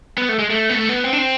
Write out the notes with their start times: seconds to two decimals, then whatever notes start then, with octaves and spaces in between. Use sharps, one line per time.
0.18 B3
0.29 A3
0.39 G#3
0.50 A3
0.69 B3
0.75 A3
0.89 B3
1.04 C4
1.13 D4
1.18 C4